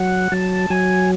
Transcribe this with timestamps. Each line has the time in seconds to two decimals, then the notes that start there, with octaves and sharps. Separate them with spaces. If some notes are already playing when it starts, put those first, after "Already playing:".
Already playing: F#3 F#5
0.32 F#3 A5
0.70 F#3 G#5